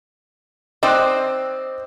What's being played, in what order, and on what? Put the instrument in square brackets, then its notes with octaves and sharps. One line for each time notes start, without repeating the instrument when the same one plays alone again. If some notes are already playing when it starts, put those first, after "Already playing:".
[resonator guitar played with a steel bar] C4 D#4 C5 [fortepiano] D5 D#5 D6 [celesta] G5 F#6